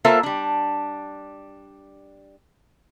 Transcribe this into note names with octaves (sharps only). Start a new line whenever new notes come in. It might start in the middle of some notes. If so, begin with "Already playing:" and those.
A#3 F4 A4 A#4 C5 E5
G3 D4